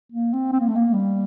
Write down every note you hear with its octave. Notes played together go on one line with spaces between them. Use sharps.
A#3
C4
C4
A#3
A3
A#3
G3